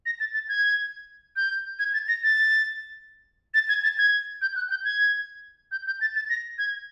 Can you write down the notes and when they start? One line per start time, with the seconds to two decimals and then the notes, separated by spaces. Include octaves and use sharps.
0.06 A#6
0.20 A6
0.34 A6
0.49 G#6
1.36 G6
1.79 G#6
1.93 A6
2.08 A#6
2.23 A6
3.54 A6
3.69 G#6
3.83 A6
3.98 G#6
4.41 G6
4.55 F#6
4.70 G6
4.84 G#6
5.71 G6
5.86 G6
6.01 A6
6.15 A6
6.29 A#6
6.58 G#6